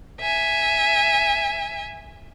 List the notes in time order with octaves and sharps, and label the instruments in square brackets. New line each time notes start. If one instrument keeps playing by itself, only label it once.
[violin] E5 G#5